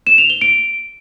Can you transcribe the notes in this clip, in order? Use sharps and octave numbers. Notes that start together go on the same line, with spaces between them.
E7
F7
G7
D7